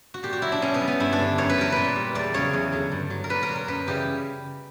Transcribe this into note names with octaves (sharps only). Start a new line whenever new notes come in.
F#4
A#2 G4
F#4
F#3 E4
D4
B2 C#4
B3
G3
B3
G2 E4
D4
D3 G3
F#2 C#5
B4
E3 G3 A#4
A#2 B4
G3
E2 D5
C#3 F#3 C#5
E2
D3 F#3
G2
F#3
A#4
A#2 B4
A#4
F#3
A#4
F#2 B4
C#3 E3 G3 G4